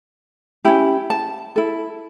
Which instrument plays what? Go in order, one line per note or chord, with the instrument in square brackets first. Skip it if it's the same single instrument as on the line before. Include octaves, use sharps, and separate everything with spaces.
[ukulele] C#4 E4 G4
A5
E4 A4